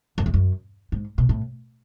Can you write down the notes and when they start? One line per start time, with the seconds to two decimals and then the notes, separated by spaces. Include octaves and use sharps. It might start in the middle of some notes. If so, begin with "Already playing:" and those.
0.18 F#2
0.26 E2
0.34 F#2
0.92 G#2
1.18 B2
1.29 A2